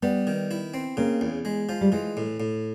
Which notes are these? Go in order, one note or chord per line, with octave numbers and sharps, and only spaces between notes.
G3 B3
D#3
E4
C4
C#3 A#3
E2
G#3
F3
G3
E3 G#3
A2
A2